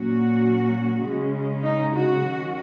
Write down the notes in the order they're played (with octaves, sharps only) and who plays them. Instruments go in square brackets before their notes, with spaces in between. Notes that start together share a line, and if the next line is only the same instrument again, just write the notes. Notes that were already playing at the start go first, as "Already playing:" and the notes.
Already playing: [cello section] A#2 F#3 A#3 C#4 F#4
C#3 G#3 C#4
D#4
F#4
D#3 F#3 C#4